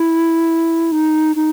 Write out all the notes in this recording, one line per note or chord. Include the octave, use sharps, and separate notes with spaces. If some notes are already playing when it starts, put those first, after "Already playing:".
Already playing: E4
D#4
D#4